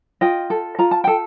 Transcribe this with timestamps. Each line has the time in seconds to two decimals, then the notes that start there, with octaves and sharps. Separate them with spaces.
0.21 F4 D#5 G5
0.50 A4
0.79 F4 A#5
0.91 A5
1.04 A4 G5